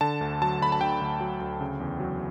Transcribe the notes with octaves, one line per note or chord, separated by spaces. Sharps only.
D3 A5
D2
F#3 A5
D2 B5
A5
D3 G5
D2
F#3
D2
C#3
E2
F#3